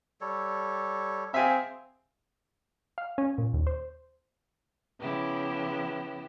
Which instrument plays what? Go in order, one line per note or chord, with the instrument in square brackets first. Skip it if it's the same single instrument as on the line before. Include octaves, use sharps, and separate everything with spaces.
[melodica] G3 A4 C#5
[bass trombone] C4 [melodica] G#4 [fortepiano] E5 F5 G#5
[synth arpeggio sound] F5
C#4
A#2
D#2
C5
[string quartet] C#3 F3 B3 E4 G4